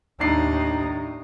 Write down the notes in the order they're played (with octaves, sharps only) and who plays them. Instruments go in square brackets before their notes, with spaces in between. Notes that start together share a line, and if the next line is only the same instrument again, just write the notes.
[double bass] D#2 D#4 [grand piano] A2 D4 C7